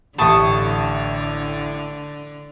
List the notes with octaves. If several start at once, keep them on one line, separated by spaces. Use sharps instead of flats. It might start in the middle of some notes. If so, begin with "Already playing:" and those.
A1 A2 D3 G4 A5 C#6 D#6